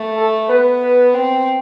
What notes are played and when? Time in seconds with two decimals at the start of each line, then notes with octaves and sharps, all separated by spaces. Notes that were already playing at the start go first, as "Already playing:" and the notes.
Already playing: A3
0.17 A4
0.49 B3 B4
0.81 B4
1.14 C4